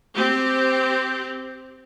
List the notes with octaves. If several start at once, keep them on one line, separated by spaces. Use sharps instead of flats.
C4 G4